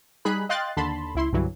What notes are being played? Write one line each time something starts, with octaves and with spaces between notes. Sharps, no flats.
G3 D#4 G#4 B5 F#6
D#5 F5 G5 C6 F#6 A6
D#2 D3 A5 B5 C6
C#2 E4 C6
C2 G2 D3 E3 F#3